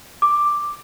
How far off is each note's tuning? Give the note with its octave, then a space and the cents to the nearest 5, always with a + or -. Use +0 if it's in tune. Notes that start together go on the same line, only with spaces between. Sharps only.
D6 +5